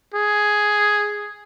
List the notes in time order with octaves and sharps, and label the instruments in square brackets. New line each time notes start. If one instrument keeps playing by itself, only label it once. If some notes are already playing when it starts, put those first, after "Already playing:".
[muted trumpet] G#4